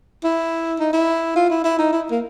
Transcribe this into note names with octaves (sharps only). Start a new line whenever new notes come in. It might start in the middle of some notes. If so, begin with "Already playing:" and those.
E4
D#4
E4
F4
E4
E4
D#4
E4
A#3